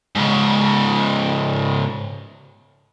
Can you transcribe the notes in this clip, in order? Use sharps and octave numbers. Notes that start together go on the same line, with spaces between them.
G#2 C#3